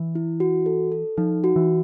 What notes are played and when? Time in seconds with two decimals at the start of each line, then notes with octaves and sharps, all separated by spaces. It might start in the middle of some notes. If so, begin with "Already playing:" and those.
Already playing: E3
0.15 E4
0.40 F#4
0.66 A4
0.92 A4
1.17 F3 D#4
1.44 F#4
1.56 E3